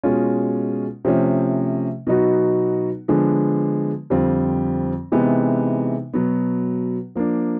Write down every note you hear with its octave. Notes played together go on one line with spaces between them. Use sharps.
B2 G#3 C#4 F4
C3 F3 A3 C#4
B2 F#3 B3 D#4 F#4
D3 F3 G#3 B3 D4
F2 D3 G3 C4 F4
C3 E3 G#3 B3 D#4
B2 F#3 B3
F3 A#3 D4